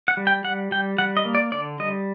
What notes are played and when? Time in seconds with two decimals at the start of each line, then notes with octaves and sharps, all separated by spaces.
0.08 F#5
0.17 G3
0.27 G5
0.44 G3 F#5
0.71 G3 G5
0.98 G3 F#5
1.17 D#5
1.25 A#3
1.35 D5
1.52 D3 D5
1.79 G3 D#5